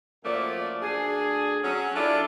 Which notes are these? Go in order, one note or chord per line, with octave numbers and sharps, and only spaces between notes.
F#2 F3 A3 A#3 D5
D2 D4 G#4
F#3 C#4
D4 E4 F4 A4 D5